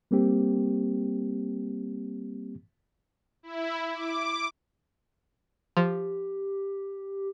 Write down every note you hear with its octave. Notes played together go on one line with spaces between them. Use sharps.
G3 A#3 C4 G4
E4
D6
F3 G4